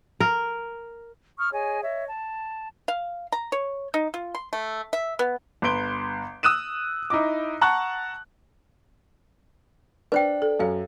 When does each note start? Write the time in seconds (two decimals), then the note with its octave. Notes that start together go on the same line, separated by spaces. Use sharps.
0.20 A#4
1.38 C#6 D#6 F6
1.52 G#4 C#5 D#5 G#5
1.83 C#5 D#5 E5
2.08 A5
2.88 F5
3.32 A#5
3.52 C#5
3.94 D#4
4.14 F4
4.35 C6
4.53 A3
4.93 E5
5.19 B3
5.62 G1 B4 C6 D7 G7
6.43 D#6 E6 F#6 D#7 E7
7.10 D#4 E4 D#5 D6
7.61 F#5 A5 A#5 C#6 F#6
10.12 D4 B4 C5 G5
10.42 A4
10.60 F#2 A4 F5